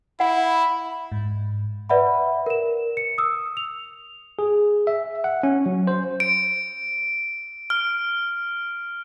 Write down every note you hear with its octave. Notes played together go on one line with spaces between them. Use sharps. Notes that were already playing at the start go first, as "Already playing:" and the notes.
E4 F#5 B5
G#2
B4 D5 E5 F#5 B5
A#4 E7
C#7
D#6 E6
F7
G#4
E5
F#5
C#4
F#3
C5
D7
F6